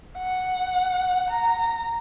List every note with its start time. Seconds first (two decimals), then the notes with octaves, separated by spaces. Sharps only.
0.18 F#5
1.30 A#5